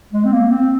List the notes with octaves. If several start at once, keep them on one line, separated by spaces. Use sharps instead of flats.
G#3
C4
A#3
C4